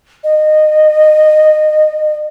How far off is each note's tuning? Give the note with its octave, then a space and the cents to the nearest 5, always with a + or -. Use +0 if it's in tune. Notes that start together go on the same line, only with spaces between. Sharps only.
D#5 -20